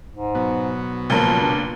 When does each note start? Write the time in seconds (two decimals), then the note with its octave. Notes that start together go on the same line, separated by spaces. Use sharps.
0.12 G#2
0.35 B2 F#3 B3
1.10 C#2 A#2 F3 A#4
1.41 D4